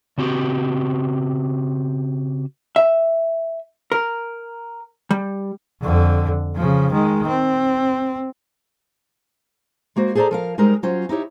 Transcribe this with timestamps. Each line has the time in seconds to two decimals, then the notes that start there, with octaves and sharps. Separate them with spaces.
0.18 C#3 C4 F#4 G4
2.76 E5
3.92 A#4
5.11 G3
5.82 F2 D3
6.56 C#3 F3
6.92 D#3 G#3
7.27 C4
9.96 G#3 A#3 F#4 C5
10.15 G#4 A4 C5 D5 A5 A#5
10.31 F3 A#4 F5
10.58 G3 G#3 D#4 G#4 A#4 C5
10.83 F#3 C#4 F4 C5
11.09 D#4 E4 G4 C#5